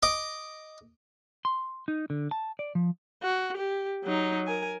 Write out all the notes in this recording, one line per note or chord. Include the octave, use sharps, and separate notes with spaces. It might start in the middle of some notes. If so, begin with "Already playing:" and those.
D#5 D6
C6
D#4
D3
A5
D5
F3
F#4
G4
F#3 D#4
A#4 G#5